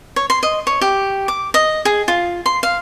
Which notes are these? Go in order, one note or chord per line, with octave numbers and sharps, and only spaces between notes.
C#5
C6
D#5
C#5
G4
D6
D#5
G#4
F4
C6
F5